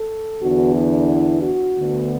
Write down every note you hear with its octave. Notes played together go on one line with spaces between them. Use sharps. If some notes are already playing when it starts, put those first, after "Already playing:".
Already playing: A4
E2 D3 B3 D4 F#4
E4
F#4
D2 D3 B3 D4